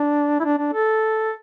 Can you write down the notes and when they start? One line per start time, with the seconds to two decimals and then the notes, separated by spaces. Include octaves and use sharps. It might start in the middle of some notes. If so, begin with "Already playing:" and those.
Already playing: D4
0.40 E4
0.44 D4
0.58 D4
0.73 A4